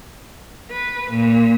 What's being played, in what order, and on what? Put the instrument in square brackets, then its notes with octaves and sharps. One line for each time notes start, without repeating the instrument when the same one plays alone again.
[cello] B4
A#2